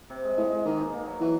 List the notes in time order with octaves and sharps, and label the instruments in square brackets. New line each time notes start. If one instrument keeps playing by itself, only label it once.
[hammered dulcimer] C3
G#3
[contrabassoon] A2 [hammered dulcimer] G#3
[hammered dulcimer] G#3
[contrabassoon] D#3 [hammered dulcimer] A#3
[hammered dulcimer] B2
A#3
F#3
[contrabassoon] E3 [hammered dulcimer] F#4